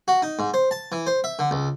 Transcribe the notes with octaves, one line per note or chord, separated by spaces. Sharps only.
F#4
D#4
G#2
C5
A5
E3
C5
E5
D3
C#2